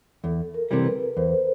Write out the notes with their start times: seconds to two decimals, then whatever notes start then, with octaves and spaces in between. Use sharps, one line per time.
0.24 E2 A4
0.54 A#4
0.71 C3 E3 G3
0.85 B4
1.17 E2 C5